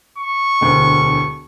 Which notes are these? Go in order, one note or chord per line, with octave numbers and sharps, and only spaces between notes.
C#6
E1 D2